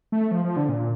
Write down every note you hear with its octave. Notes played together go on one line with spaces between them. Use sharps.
A3
F3
F3
D3
A#2